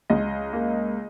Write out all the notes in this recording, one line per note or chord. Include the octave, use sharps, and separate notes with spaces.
C#2 D#5
A#3